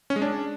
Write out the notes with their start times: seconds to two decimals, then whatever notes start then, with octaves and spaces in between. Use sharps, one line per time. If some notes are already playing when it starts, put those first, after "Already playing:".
0.10 C#4
0.16 G#3
0.22 D4